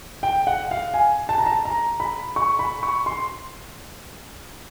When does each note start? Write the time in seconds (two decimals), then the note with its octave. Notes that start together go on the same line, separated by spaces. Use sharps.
0.23 G5
0.47 F#5
0.71 F5
0.94 G#5
1.29 A5
1.38 A#5
1.46 A5
1.65 A#5
2.00 B5
2.36 C#6
2.59 B5
2.83 C#6
3.06 C6